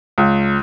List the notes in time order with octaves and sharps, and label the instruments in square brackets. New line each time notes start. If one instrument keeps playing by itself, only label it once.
[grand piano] C#2